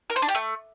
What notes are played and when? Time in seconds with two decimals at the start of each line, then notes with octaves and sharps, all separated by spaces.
0.10 A#4
0.16 C5
0.22 D4
0.28 G4
0.35 A3